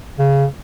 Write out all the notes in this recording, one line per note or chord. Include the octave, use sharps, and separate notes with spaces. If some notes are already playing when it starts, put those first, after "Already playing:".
C#3